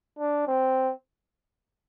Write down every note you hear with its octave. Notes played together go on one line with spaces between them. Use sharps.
D4
C4